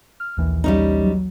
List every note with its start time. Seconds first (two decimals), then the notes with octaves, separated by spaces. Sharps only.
0.20 F6
0.37 A#1 D#2 E3
0.64 G3 C#4 D#4
1.03 F#3